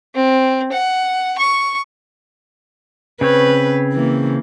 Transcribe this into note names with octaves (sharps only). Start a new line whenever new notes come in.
C4
F#5
C#6
C#3 C4 B4 C#5
E3 A#3